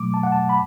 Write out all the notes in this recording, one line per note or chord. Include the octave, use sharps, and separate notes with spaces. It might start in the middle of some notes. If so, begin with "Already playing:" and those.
Already playing: B2 F#3 A3 D6
A5
F#5
A5
B5